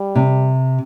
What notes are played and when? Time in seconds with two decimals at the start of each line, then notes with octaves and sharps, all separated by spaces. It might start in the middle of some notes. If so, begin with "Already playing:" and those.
Already playing: G3
0.15 C3